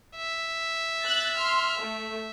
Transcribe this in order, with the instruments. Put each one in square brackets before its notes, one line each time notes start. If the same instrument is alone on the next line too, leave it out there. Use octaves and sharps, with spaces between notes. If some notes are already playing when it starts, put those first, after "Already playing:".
[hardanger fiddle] E5
[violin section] F#6 A6
C6 F6
A3